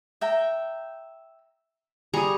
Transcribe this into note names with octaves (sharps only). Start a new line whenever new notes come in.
E5 G5 A#5
G3 G#4 A#5 C#6 D#6